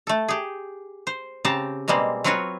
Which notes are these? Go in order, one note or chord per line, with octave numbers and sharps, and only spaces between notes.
A3 A4
G4 G#4
C5
C#3 C4 G4 A5 A#5
B2 G3 G#3 A#3 C4
F#3 C4 F4 F#4 B4 C#5